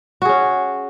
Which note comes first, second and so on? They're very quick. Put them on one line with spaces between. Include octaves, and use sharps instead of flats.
F#4 G#4 C#4